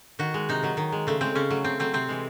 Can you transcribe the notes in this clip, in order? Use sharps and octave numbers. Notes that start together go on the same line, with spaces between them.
D#3 F#4
G#3
C3 D#4
D#3 F#3
D#3
G#3
C#3 A3
G#3 C4
C#3 C#4
F#3 A3
C#3 C4
F#3 A3 C4
C3 C4
E3 G#3